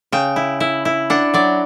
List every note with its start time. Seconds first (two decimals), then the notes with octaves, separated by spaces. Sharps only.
0.12 C#3 G5
0.36 E4
0.60 E4
0.85 E4
1.10 D4 F#5
1.34 F#3 D5